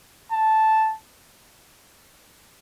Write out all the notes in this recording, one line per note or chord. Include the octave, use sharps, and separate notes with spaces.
A5